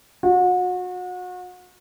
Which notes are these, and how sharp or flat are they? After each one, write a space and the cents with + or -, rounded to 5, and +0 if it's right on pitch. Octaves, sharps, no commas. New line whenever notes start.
F#4 -35